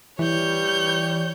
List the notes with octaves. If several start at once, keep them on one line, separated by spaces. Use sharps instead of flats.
E3 G3 C#5 G6